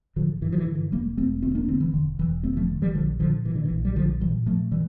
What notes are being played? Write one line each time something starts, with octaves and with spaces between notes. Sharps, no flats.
A1 D3 F3
G2 E3
F3
E3
D3
E3
E1 G3 A#3
E1 A3 C4
D2 A3 C4
A#3 D4
D3 A3 C4
E3
E1 D3
E1 E3
D2 A3 C4
F3 A3
D3
E3 G3
A#1 D3 F3
A#2 D3 F3
A#2 E3
D3
E3
A#1
G3
A#1 D3 F3
A#2 E3 G3
A#2 F3 A3
E3 G3